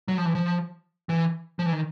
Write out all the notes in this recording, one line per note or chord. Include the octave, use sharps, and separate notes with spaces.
F#3
F3
E3
F3
E3
F3
E3
D#3